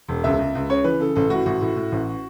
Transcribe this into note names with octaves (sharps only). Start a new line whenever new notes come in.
E1
C#2 E5
C#2
C#2
C#3 C#5
E3 B4
C#3 A4
A1 A4
A2 F#4
A1 F#4
A2
A2
A1